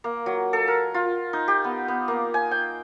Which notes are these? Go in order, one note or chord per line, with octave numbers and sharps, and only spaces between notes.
A#3
F#3
A4
A#4
F4
D#4
G4
B3
B3
A#3
G#5
G5